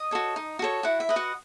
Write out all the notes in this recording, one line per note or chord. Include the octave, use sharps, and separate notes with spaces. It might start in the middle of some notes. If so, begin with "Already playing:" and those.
Already playing: D#5 D#6
F#4 A4 C#5
D#4
F#4 A4 C#5
E4 F#4 F#5
E5
B4 D#5
F#4 F#5